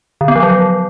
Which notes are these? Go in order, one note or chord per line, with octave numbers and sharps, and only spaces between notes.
D3
B3
F3
F#3